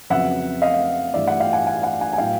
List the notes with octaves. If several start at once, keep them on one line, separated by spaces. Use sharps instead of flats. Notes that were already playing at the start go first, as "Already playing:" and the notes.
F2 C#3 F#3 B3 E5 F#5
D#5 F5
G2 E3 A3 D5 E5
E5 F#5
F5 G5
F#5 G#5
F#5 G#5
F#5 G#5
F#5 G#5
G#5
A2 F#3 B3 E4 F5 G5